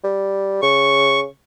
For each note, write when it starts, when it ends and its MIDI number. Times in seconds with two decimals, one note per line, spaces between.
0.04 0.58 55
0.62 1.25 49
0.62 1.20 85